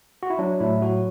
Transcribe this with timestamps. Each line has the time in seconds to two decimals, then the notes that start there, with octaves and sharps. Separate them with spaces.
0.23 F#4
0.30 E4
0.39 F#3 D4
0.60 A2 E4
0.82 F#3 F#4